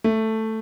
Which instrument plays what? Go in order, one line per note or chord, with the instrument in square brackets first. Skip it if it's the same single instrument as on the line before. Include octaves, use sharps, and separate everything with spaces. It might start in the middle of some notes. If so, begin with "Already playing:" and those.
[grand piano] A3